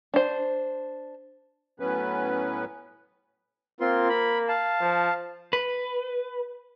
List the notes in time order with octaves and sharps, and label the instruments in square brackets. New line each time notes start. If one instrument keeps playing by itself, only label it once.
[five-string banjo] D4 C5
[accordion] A2 F#3 B3 C#4 B4
[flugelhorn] A#3 [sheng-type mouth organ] C4 F4 C6
[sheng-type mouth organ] B5
F5 A5
[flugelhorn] F3
[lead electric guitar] B4